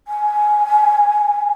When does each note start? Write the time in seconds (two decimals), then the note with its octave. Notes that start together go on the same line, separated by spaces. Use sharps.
0.08 G#5